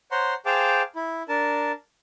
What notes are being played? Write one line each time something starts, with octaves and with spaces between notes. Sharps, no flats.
C5 C#5 F#5 A#5 C6
G#4 C5 F5 G5 A5 D6
E4
D4 A#4 A5